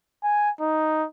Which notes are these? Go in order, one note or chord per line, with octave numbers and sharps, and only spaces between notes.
G#5
D#4